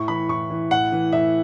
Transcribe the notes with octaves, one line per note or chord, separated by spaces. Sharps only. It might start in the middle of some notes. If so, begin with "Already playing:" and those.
Already playing: A2 C#6
E3 B5
A2 C#6
E3
A2 F#5
E3
A2 E5